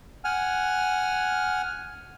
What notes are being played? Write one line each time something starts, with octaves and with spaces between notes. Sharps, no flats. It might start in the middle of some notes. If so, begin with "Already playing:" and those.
F#5 G#5 F6